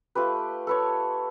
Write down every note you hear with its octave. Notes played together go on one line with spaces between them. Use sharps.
A3 F4 G4 B4
A4 B4 C#5